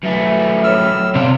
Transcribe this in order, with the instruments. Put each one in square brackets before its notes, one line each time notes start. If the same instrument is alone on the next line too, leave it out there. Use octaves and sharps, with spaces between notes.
[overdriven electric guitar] F#2 A3 [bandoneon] E3
[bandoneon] A2 E6 F6
[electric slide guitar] C3 [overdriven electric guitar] D4 F4